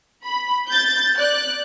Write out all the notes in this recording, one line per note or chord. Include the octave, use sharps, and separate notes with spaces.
B5
G6 A6
D5 F#6